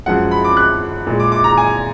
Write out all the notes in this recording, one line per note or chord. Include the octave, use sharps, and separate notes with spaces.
F#2 F3 G#3 F#5
B5
D6
F#6
A#2 G#3
D6
D6
A#5
G#5